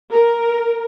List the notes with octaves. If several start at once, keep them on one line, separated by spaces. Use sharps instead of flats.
A#4